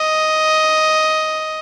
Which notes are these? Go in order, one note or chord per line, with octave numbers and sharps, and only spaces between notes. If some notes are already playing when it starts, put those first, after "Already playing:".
Already playing: D#5